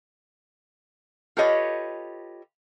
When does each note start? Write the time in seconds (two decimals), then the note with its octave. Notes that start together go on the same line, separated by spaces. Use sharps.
1.37 F4 G4 A4 B4 C#5 D#5